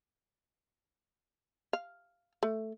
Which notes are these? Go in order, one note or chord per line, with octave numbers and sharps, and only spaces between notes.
F5
A3